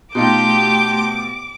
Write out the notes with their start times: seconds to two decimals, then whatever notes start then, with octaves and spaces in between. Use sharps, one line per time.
0.15 B2 A3 D#4 F4 G4 C6 D6 G6